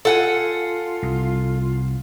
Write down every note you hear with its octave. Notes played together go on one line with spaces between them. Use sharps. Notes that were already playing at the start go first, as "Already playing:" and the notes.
F4 A4 F#5 G#5
C2